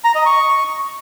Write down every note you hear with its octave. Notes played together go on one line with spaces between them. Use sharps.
A#5
D#5
C#6